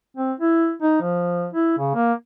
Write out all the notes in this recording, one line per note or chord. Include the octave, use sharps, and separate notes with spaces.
C4
E4
D#4
F3
E4
C#3
A#3